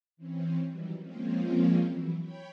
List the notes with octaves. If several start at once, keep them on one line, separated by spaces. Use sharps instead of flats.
E3 C4 C#4
D#3 E3 F#3 G3
F3 G#3 A#3 C4 C#4 F4
E3 F#3 E4
C#5 G5 B5